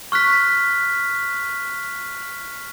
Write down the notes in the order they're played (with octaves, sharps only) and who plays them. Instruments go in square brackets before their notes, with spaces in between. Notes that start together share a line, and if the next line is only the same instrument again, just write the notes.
[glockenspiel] C#6 F6 F#6 B6